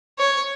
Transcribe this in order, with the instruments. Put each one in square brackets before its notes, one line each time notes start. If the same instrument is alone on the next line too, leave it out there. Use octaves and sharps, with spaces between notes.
[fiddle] C#5